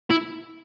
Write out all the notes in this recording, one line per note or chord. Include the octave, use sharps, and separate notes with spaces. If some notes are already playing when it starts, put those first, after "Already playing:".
E4